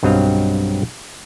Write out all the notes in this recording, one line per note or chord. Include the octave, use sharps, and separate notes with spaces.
B1 G2 F#3 C4 D#5 F5